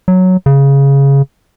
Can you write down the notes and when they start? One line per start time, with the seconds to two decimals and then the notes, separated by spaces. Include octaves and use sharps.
0.08 F#3
0.46 C#3